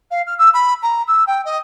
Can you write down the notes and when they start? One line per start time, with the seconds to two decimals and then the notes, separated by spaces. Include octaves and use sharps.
0.11 F5
0.27 F6
0.38 E6
0.54 B5
0.82 A#5
1.07 E6
1.27 G5
1.45 D#5